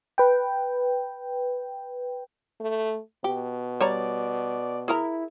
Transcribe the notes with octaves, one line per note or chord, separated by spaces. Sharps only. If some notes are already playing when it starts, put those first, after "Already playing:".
B4 G5
A3
B2 G4
G3 C#5 D5 A#5
E4 G#4 A#4 A#5